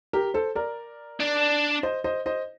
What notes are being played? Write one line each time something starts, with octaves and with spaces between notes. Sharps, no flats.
G4 A#4
A4 C5
A#4 D5
D4
C5 D#5
C5 D#5
C5 D#5